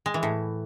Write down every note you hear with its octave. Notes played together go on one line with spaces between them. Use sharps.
G#3
E3
A2